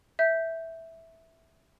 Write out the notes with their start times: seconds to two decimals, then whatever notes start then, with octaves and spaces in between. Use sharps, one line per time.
0.19 E5 G6